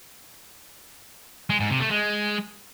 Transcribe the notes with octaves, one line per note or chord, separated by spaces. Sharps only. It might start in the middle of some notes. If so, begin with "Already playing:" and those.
G#3
G#2
C3
A3
G#3